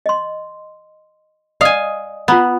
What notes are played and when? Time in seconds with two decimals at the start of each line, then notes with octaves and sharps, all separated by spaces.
0.06 D#5 C6
1.61 D5 D#5 F5 G#5 D#6
2.28 B3 F4 A#5 B5